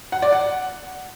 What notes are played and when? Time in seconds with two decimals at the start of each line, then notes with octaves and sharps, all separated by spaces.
0.12 F#5
0.22 D5
0.32 F#5